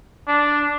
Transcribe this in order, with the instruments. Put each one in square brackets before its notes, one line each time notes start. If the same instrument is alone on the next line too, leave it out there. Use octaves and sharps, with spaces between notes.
[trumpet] D4